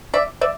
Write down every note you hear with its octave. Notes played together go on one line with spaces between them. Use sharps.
D5 E5
D5 E5